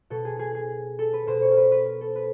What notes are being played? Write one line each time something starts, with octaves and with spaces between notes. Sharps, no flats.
B2 A4
G#4
G#4
G#4
A4
B4
B2 C5
C#5
A#4
B4
B4
A#4
A4
B4